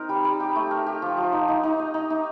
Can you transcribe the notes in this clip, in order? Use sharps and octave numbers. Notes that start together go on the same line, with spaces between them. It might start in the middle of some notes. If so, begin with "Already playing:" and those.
Already playing: C4 D#4 A#4
G3
G3
G4
A3
A#4
G4
F3
F3
D#4
D#4
D#4
D#5
D#4
D#4